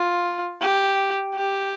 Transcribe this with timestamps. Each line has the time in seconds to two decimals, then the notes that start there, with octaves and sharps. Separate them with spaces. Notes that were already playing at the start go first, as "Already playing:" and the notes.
Already playing: F4
0.62 G4
1.35 G4